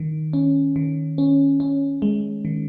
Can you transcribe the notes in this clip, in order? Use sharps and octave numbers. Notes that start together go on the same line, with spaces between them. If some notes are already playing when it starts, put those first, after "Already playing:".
Already playing: D#3
C#4
D#3
C#4
C#4
G#3
D#3